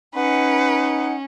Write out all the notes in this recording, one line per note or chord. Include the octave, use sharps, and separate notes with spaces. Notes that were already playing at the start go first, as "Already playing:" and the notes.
C#4 D#4 B4 F#5